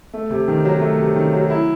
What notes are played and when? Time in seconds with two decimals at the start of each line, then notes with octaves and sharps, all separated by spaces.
0.14 A3
0.30 C3
0.48 D#3
0.65 F#3
0.81 A3
0.99 C3
1.16 D#3
1.33 F#3
1.50 E4